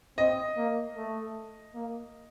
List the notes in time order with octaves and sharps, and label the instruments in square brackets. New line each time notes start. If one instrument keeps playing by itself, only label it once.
[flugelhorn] C4 [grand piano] D#5
[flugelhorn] A#3
A3
A#3